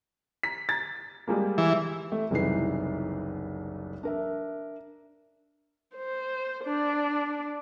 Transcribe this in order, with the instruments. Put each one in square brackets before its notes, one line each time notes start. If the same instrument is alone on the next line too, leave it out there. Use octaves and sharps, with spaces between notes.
[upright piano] B6
A6
G3 G#3 A#3
[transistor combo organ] E3
[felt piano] A3
F#1 C2 E3 D#4 B4 C7
D4 A#4 E5
[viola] C5
D4